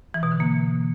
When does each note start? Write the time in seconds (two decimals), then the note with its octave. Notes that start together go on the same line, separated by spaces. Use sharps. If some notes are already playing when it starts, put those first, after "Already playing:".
0.14 E3
0.23 B2
0.32 D3
0.40 A#3